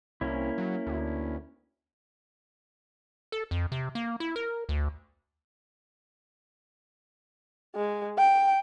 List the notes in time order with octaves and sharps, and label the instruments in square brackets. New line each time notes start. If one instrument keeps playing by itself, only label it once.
[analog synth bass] C2 [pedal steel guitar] A#3 C#4 E4
[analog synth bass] F#3
D2
[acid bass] A4
F2
C3
A#3
E4
A#4
D2
[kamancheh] G#3
G5